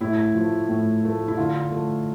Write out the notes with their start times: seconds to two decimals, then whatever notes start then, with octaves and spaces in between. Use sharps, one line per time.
0.01 A2 E4
0.35 F3 A3
0.69 A2
1.03 F3 A3
1.28 E4
1.37 D3 F4
1.71 F3 A3